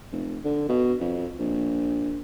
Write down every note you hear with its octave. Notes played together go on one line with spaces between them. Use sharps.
F1
D3
B2
F2
A#1